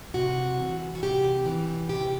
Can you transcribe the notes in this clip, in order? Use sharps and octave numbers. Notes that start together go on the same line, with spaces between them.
C3 F#4
E3
F#4
C3 G4
E3
C3 G4